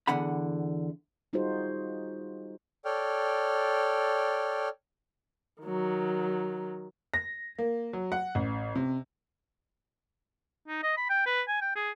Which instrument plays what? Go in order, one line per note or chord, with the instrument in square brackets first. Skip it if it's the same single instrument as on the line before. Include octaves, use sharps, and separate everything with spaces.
[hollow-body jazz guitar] E2 D3 F#5 B5
[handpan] G3 D#4 F4 F#4 G#4 C5
[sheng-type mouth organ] A4 C#5 D5 G5 F6
[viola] D#3 F#3
[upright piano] A#6
A#3
F#3
F#5
A1
C3
[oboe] D#4
D#5
B5
G5
B4
G#5
G5
G#4